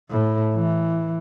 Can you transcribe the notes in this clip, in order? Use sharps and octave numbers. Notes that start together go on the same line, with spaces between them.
A2
E3